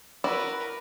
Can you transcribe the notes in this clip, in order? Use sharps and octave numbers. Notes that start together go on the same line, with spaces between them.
E4 F#4 A#4 B4 D5